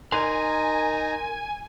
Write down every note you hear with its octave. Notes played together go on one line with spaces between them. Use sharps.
D#4 A#4 G#5 A#5 C6